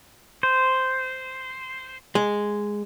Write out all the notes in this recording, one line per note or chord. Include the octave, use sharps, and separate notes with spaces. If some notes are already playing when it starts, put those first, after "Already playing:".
C5
G#3